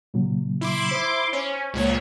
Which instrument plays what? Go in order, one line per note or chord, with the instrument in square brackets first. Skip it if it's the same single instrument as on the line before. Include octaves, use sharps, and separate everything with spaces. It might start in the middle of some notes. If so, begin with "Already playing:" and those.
[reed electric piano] A#2 C#3 F#3
[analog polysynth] E4 C6 D6
[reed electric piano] C5 D#6
[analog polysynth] C#4
C#2 A#2 C#5